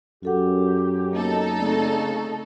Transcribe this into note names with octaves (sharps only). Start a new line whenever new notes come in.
F#2 F#4 G4 A4 F#5
A#3 B3 D#4 A4
C#3 A3 C4 D5